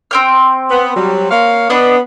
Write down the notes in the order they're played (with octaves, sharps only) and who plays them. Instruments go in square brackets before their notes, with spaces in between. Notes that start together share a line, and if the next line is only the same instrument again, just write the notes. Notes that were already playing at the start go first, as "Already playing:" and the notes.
[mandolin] C4 G5 F6
[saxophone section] B3
F#3 G3
A#3 C#5 F5
[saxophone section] B3 [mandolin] D4 D#5